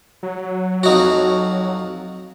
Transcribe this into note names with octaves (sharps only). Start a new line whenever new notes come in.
F#3
F2 D#4 F#4